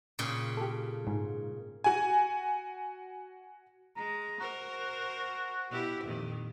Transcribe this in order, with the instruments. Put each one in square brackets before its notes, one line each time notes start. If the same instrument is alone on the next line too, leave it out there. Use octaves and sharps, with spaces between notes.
[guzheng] A#2 C#3 G5
[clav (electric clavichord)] G4 A4
G#2
[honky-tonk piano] F#4 G#5
[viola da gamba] G#3 [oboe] A#5
[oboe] F#4 [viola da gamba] A#4 C5
[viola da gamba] B2 E4 G4
F2 A#2 D#3